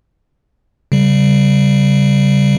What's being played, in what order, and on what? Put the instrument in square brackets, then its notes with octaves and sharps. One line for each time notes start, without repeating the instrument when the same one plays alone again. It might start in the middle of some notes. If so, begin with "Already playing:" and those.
[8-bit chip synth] C#3 G3